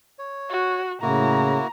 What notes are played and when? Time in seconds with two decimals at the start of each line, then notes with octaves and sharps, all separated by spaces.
0.19 C#5
0.50 F#4
1.02 A2 C#3 A#3 E4 F#4 A#5